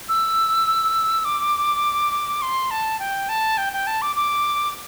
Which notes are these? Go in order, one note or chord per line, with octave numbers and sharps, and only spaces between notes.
E6
D6
C6
A5
G5
A5
G5
G5
A5
D6
D6